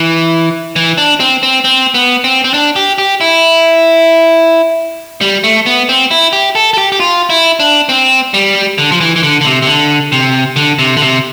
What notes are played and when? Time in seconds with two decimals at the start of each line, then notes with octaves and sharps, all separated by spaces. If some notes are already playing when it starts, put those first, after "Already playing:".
Already playing: E3
0.76 E3
0.98 D4
1.20 C4
1.43 C4
1.64 C4
1.94 B3
2.24 C4
2.44 C4
2.54 D4
2.76 G4
2.98 G4
3.21 E4
5.21 G3
5.44 A3
5.66 B3
5.89 C4
6.11 E4
6.33 G4
6.55 A4
6.74 A4
6.78 G4
6.92 G4
7.00 F4
7.30 E4
7.60 D4
7.89 C4
8.34 G3
8.78 D3
8.92 F3
9.01 E3
9.16 E3
9.23 D3
9.41 D3
9.45 C3
9.62 C3
9.67 D3
10.12 C3
10.56 D3
10.79 C3
10.97 D3
11.02 C3